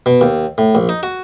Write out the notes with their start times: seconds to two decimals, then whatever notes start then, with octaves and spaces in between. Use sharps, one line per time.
0.06 B2
0.21 D#2
0.58 A2
0.75 A#1
0.89 D#4
1.03 F#4